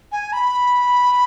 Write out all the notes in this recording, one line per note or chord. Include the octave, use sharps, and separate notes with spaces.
G#5
B5